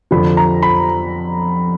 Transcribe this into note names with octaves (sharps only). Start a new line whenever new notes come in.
F2 D3 F3 B5
A#5
B5